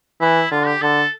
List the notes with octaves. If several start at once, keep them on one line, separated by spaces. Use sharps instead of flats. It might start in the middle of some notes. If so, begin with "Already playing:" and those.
E3 E4
D3 F4
G4
D3 A4